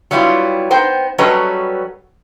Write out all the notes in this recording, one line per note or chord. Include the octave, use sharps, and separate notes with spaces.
F#3 G3 B3 E4 F4
B3 D#4 C5 G5
F#3 G3 C#4 A4 B4 D#5